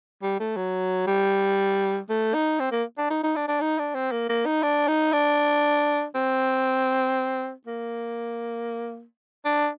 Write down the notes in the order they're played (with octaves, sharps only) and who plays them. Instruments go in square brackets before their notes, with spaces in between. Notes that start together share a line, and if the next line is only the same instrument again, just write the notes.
[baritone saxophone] G3
A3
F#3
G3
A3
D#4
C4
A#3
D4
D#4
D#4
D4
D4
D#4
D4
C4
A#3
A#3
D#4
D4
D#4
D4
C4
A#3
D4